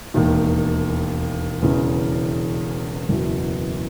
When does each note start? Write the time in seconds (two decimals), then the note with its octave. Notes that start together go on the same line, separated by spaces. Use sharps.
0.14 E1 D#2 D#3
1.61 E1 E2 C#3 E3
3.09 F#1 E2 B2